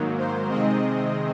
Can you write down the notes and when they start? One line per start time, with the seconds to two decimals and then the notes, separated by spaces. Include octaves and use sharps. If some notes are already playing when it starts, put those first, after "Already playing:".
Already playing: G#2 D#3 F#3 A#3
0.18 C5
0.49 C3 D#3 G#3 C4 D#5